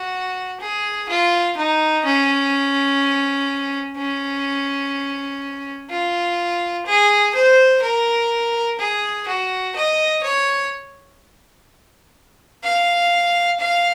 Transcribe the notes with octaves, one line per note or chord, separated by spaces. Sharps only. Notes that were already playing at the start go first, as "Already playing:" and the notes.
Already playing: F#4
G#4
F4
D#4
C#4
C#4
F4
G#4
C5
A#4
G#4
F#4
D#5
C#5
F5
F5